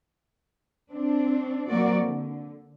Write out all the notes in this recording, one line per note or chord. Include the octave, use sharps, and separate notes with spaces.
C4 D4
F#3 A#3 C4 F#4 A#4 D5
D3